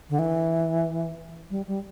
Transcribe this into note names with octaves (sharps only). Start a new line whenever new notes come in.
D3
E3
G3
G3